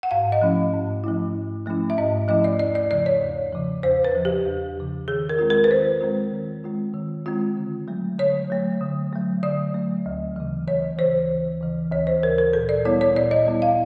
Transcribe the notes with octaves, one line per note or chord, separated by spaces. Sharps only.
F#5
G#2 F5
D#5
F3 A3 C#4 E4
G#2
F3 A3 C#4 E4
G#2
F3 A3 C#4 E4
E5
G#2 D#5
F3 A3 C#4 E4 D#5
D5
E2 D5
D5
C#3 F3 D5
C#5
E2
C#3 F3
E2 C5
B4
C#3 F3
G4
E2
C#3 F3
D#3 G#4
A#4
G#3 C4 F4
A#4
B4
D#3 C5
G#3 C4 F4
D#3
G#3 C4 F4
D#3
G#3 C4 F4
D3
F#3 A3
D3 C#5
F#3 A3
D3
F#3 A3
D3 D5
F#3 A3
D2
C#3 E3
D2 C#5
C#3 E3 C5
D2
C#3 E3
D2 C#5
C5
C#3 E3 A#4
A#4
A#2 A4
D5
G3 B3 E4 C#5
C#5
A#2 D5
D#5
G3 B3 E4
F5